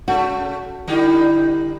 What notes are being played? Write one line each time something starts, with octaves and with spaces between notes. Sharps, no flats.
C#3 A3 F#4
D3 G3 D#4 E4